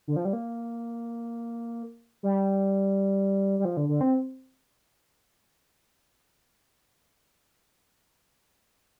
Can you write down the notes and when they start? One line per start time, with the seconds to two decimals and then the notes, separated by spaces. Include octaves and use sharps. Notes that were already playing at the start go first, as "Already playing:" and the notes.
0.08 D3
0.16 F3
0.25 G3
0.33 A#3
2.23 G3
3.59 G3
3.65 F3
3.77 D3
3.89 D3
4.01 C4